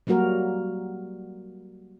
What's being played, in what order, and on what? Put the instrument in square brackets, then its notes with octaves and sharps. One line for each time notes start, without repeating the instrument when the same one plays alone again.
[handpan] F#3 G3 A#3 F#4 A#4